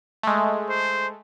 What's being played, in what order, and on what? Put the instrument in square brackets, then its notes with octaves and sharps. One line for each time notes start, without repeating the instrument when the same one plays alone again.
[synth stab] G#3 A3
[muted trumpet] C5